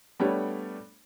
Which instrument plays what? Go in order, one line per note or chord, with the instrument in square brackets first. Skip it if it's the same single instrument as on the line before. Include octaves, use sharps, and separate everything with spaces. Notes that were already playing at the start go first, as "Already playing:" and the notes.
[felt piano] G3 A3 B3 D4 C#5